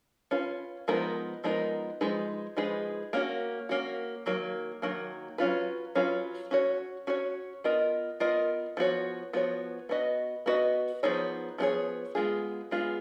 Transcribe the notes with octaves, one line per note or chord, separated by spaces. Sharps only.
C#4 F4 B4
F3 G#3 B3 D#4 A#4
F3 G#3 B3 D#4 A#4
F3 G#3 D#4 G#4 B4
F3 G#3 D#4 G#4 B4
A#3 C#4 F#4
A#3 C#4 F#4
D#3 F#3 A#3
D#3 F#3 A#3
F#3 C#4 F4 B4
F#3 C#4 F4 B4
C#4 F#4 C#5
C#4 F#4 C#5
B3 F4 A#4 D#5
B3 F4 A#4 D#5
F3 B3 F#4 C#5
F3 B3 F#4 C#5
B3 F#4 B4 D#5
B3 F#4 B4 D#5
F3 B3 D#4 G#4 C#5
F3 B3 D#4 G#4 C#5
G#3 B3 F4 G#4
G#3 B3 F4 G#4